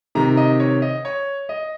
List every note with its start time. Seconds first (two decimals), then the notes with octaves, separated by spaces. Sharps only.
0.15 C3 D#3 A#5
0.37 D#5
0.60 C#5
0.82 D#5
1.05 C#5
1.49 D#5